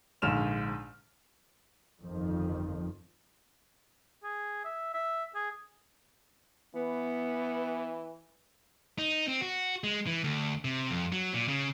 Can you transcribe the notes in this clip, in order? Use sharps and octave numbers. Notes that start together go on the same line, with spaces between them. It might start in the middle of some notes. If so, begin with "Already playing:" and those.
A#1 G#2 D3 F6 E7 F7
G1 F2 D#3 F3
G#4
E5
E5
G#4
E3 B3
D#4
C4
F#4
G#3
E3
D2
C3
F2
F#3
A#2
C#3